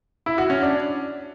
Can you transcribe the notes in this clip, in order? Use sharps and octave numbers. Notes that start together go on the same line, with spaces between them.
E4
F#4
C#4
D4